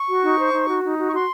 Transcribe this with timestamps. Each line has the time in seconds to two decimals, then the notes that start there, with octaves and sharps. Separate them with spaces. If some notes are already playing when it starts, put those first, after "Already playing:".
Already playing: C#6
0.09 F#4
0.23 D#4
0.39 C5
0.53 D#4
0.68 F#4
0.84 D#4
0.98 F#4
1.08 C#6
1.13 F#4 C6